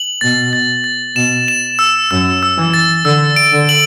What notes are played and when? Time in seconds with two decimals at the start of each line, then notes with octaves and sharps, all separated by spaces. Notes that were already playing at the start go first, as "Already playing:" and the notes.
Already playing: F#7
0.21 B2 A6
0.53 A6
0.84 A6
1.16 B2 E7
1.48 E7
1.79 E6
2.11 F#2 E6
2.43 E6
2.58 E3
2.74 A6
3.05 D3 E6
3.36 D7
3.52 D3
3.69 F#7